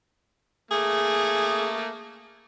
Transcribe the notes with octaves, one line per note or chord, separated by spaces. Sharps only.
A3 A#3 G#4